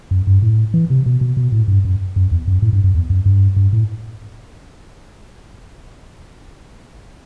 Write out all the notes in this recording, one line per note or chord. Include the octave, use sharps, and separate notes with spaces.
F#2
G2
A2
E3
C3
B2
B2
B2
A2
G2
F#2
F#2
E2
F#2
A2
G2
F#2
E2
F#2
G2
G2
A2